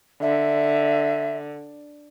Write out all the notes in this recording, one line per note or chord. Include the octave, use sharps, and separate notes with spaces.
D3 E5